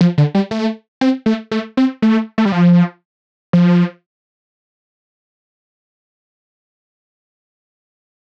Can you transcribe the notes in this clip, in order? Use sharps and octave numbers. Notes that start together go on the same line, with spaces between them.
F3
D3
G3
A3
C4
A3
A3
C4
A3
A3
G3
F3
F3